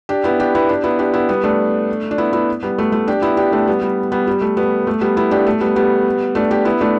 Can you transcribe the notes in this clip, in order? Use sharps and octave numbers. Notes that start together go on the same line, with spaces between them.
D4 G4
B3 E4
D4 G4
B3 E4
D4 G4
B3 E4
D4 G4
B3 E4
G3 B3
A3 D4
D4
B3 E4
B3 E4
G3 B3
A3
A3
D4 G4
B3 E4
D4 G4
A3 D4
G3 B3
G3
G3 B3
G3
A3
G3 B3
A3
G3 B3
B3 E4
D4 G4
A3
G3 B3
G3 B3
A3 D4
D4 G4
B3 E4
A3 D4